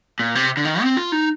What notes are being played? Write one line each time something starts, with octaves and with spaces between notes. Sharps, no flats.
A#2
C3
D3
D#3
C4
F4
D#4